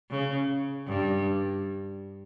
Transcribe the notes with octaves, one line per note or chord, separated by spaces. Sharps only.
C#3
G2